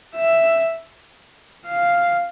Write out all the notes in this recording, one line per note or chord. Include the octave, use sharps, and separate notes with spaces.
E5
F5